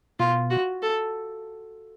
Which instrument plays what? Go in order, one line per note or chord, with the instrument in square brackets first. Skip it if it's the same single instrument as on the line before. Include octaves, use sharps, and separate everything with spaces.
[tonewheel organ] B2 [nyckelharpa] F4
[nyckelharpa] F#4
A4